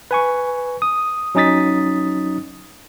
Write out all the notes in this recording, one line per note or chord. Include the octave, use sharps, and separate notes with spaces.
B4 G#5 C#6
D#6
F#3 C#4 D#4 D#6 A6 B6